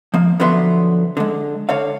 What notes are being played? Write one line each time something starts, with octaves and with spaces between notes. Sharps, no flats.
F3 A#3
D3 F3 F#3 B3 E5 C6
D3 G#3
D3 C#5 F5